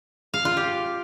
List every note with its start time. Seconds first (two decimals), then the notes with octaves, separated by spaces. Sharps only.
0.34 F5
0.45 F4
0.57 G4